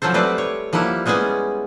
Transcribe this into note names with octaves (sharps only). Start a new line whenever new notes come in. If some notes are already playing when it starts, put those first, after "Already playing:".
F3 F#3 C#4 A4 C5
G3 A3 C4 B4 C5 D5
C#5
F3 G3 A#3 E4 F#5
G3 G#3 B3 C#4 G#4